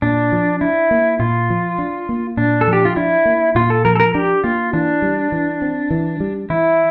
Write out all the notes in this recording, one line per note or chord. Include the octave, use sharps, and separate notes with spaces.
A#2 D4
F3
D4 E4
A#3
A#2 F4
F3
D4
A#3
A#2 D4
A4
F3
G4
F4
D4 E4
A#3
A#2 F4
A4
F3 A#4
A4
A#4
D4 G4
A#3 F4
E3 D4
G3
E3
C4
E3
G3
E3 E4